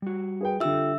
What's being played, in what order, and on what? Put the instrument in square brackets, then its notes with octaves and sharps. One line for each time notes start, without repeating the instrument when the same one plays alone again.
[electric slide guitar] G3 F#4
[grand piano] G#4 B4 G5
[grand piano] D3 G3 [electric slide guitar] F4 A4 G5 [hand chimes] E5 E6